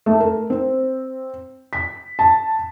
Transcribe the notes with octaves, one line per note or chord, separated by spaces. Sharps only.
A3
A#4
C4
B6
A5